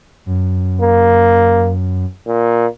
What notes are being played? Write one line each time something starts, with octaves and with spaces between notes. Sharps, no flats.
F#2
A#3
A#2